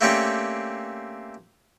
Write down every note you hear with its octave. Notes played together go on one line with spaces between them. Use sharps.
A3 A#3 C4 C#4 G4 D5